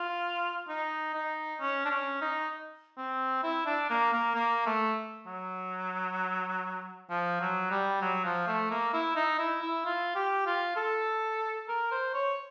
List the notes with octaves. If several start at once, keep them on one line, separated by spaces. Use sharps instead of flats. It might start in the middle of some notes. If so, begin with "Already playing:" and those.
Already playing: F4
D#4
D#4
C#4
D4
C#4
D#4
C4
E4
D4
A#3
A#3
A#3
A3
F#3
F3
F#3
G3
F#3
F3
A3
A#3
E4
D#4
E4
E4
F4
G4
F4
A4
A#4
C5
C#5